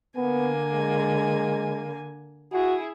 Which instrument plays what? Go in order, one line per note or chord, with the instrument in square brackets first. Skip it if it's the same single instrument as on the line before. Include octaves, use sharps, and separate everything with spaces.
[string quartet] D3 A#3 G#5 [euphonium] B3
[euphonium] G#3
[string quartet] E4 G#4 [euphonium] F#4